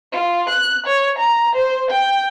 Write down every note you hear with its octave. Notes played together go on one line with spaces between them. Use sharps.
F4
F#6
C#5
A#5
C5
G5